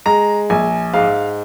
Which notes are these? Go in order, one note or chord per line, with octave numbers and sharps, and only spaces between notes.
G#3 A#5
A#1 G#5
G#2 F5